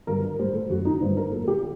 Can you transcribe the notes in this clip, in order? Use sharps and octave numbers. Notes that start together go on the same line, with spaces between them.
G2 D3 F#3 A#4
A2 G3 C5
A4
F#2 F#3 F#4
D#4
G2 D3 G3 C5
A#4
A#2 F#3 A4
A4
G4